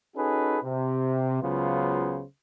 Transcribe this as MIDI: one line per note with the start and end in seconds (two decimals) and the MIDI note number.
0.16 0.58 61
0.16 0.58 63
0.16 0.58 66
0.16 0.58 68
0.16 0.58 69
0.16 0.58 71
0.64 1.39 48
1.42 2.23 37
1.42 2.23 49
1.42 2.23 54
1.42 2.23 59
1.42 2.23 65
1.42 2.23 72